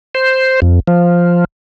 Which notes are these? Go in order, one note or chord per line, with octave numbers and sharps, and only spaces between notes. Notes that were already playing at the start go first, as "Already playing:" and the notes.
C5
F2
F3